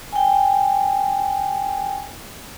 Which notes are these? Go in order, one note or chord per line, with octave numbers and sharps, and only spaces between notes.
G5 G#5